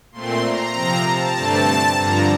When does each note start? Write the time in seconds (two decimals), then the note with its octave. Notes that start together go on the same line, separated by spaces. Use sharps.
0.12 A#2 A3 C4 C6
0.43 A#5
0.74 C3 F3 C4
1.05 A5
1.35 G2 D3 A3 C4
1.97 G2 D3 F3 A#5